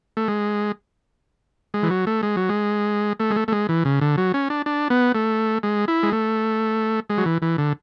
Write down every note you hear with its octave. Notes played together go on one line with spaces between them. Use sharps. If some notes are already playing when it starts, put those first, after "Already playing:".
A3
G#3
G#3
E3
F#3
A3
G#3
F#3
G#3
A3
G#3
A3
A3
G#3
E3
C#3
D3
F#3
C#4
D4
D4
B3
A3
G#3
E4
G#3
A3
G#3
F#3
E3
E3
D3